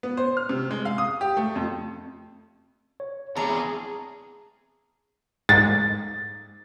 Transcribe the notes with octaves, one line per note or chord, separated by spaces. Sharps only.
B3
C5
F6
C3
G#3
F5
D#6
G4
A3
F2
C#5
E2 C3 G#4 A5 A#5
G#2 A6